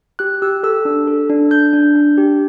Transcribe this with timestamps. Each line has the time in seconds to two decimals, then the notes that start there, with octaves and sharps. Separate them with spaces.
0.19 G4 F#6
0.42 G4 E6
0.63 A4 E6
0.85 D4
1.07 A4
1.30 D4
1.51 D4 G6
1.73 D4
1.95 D4
2.18 G4